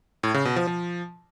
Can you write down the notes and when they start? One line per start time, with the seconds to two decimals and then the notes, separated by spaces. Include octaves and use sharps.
0.23 A2
0.34 C#3
0.45 B2
0.56 F3
0.67 F3